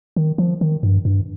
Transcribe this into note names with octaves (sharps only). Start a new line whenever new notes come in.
D#3
F3
D#3
G2
G2